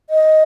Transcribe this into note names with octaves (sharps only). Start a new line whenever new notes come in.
D#5